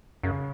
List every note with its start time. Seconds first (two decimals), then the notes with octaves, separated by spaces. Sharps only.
0.23 F#2 C#3